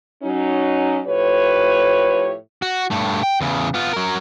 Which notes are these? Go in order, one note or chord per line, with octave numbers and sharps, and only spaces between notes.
F#3 C#4 D#4
A2 F3 G4 B4 C#5
F#4
G2 A3
G5
E2 C#3
B3 F4
F#3 A#4